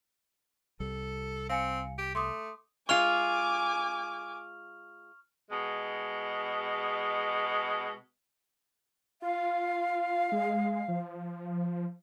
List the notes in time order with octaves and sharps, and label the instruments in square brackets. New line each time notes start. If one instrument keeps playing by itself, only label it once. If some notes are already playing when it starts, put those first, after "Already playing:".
[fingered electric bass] C2 G3 [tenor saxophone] A4
[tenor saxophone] C4 [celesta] F5 G#5 C#7
[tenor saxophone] G4
[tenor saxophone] A3 [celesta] C6 D6 D#6
[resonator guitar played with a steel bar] G#3 F4 [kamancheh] G#5 D6 [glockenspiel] C#6 F6 F7
[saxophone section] B2 G#3
[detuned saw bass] F4 [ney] F5
[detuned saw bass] G#3
F3